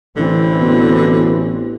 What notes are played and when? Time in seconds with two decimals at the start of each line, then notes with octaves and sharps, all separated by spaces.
0.16 A1 D3 E3 C4
0.61 B2